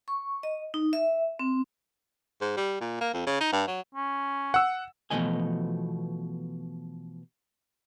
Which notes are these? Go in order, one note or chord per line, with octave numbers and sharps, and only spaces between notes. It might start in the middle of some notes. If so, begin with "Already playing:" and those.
C#6
D#5
D#4
E5
C4
G#2
G3
A#2
A#3
F2
C#3
D#4
G2
F#3
C#4
F#5 E6
B2 E3 F3 A3 D#5 G#5